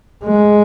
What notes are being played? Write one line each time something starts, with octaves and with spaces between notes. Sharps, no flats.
G#3